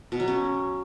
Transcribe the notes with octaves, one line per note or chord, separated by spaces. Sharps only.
B2
F#3
C#4